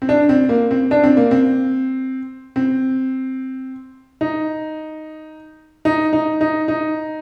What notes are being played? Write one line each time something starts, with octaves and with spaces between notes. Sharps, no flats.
C4
D4
C4
A#3
C4
D4
C4
A#3
C4
C4
D#4
D#4
D#4
D#4
D#4